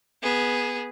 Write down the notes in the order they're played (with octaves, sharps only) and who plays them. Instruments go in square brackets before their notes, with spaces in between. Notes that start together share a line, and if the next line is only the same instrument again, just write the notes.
[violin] B3 G#4